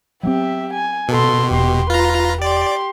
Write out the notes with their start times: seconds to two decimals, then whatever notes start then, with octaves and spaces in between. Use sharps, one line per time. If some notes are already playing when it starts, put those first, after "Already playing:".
0.23 F#3 B3 C4 G4 E5
0.73 G#5
1.09 B2 A4 C6
1.51 E1 G4 C6
1.90 F4 B4 A#5
2.42 G4 D5 C6